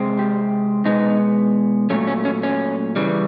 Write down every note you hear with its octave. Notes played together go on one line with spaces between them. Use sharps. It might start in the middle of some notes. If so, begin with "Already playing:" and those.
Already playing: C3 G#3 C4
G4
B2 G#3 B3 D#4
A#2 F#3 A3 C#4
C#4
C#4
C#4
C#3 E3 G3